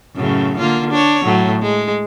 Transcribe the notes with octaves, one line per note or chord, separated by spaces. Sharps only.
F#2 A2 C#3
D3 A#3 F4
D4 C#5
A2 F#3
G#3